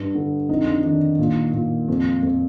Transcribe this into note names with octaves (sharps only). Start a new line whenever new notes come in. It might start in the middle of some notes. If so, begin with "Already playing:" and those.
Already playing: G2
D3
F2 D#4
D4
D#3 D4
A#2
A#2
F2
F2